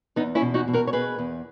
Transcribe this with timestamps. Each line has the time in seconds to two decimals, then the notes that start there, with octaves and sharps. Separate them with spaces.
0.16 E2 B3 D#4
0.35 C#4 E4
0.41 B2
0.54 D#4 F#4
0.68 B2
0.73 F#4 A#4
0.87 C#5
0.93 B2 G#4 B4
1.18 E2